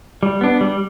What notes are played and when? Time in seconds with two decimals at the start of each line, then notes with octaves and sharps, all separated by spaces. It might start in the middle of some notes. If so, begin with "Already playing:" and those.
0.23 G3
0.41 B3 D4
0.61 G3